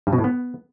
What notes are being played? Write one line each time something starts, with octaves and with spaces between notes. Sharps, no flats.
G2
B2
A2
B3